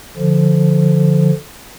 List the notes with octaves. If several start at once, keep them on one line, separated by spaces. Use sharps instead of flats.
D3 F3